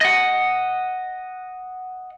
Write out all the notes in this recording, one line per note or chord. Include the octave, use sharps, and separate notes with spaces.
D#5 F#5